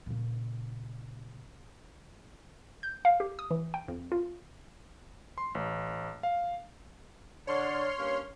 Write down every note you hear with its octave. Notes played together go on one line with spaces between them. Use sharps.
A#2 C#3
G6
F5
G4
D#6
E3
G5
F2
F4
C6
A1
F5
D3 D4 C#5 C6 F6
G2 A#3 C#4